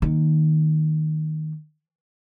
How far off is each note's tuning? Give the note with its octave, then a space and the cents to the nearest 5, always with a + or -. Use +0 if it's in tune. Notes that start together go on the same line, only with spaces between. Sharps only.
D#3 +0 A#3 +0